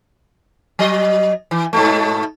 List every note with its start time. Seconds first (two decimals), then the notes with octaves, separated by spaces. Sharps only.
0.79 F#3 D#5
1.51 E3
1.73 G#2 B2 A3